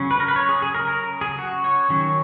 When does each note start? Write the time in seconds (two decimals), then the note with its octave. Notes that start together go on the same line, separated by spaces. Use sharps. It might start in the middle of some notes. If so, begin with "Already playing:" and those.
Already playing: C#3 F#3 C#4
0.11 B4
0.20 A#4
0.28 B4
0.36 C#5
0.49 G#4
0.62 G#4
0.74 A#4
0.88 A#4
1.21 G#4
1.39 F#4
1.64 C#5
1.90 D#3 F#3 C#4